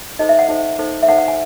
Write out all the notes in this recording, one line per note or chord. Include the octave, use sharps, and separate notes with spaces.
D#4 A4 C5 D#5
E5
F#5
D#4 A4 C5
D#4 A4 C5
E5
D#4 A4 C5 F#5
F#5
G#5